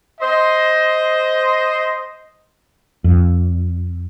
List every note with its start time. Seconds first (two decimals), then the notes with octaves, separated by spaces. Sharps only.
0.21 C5 D#5
3.04 F2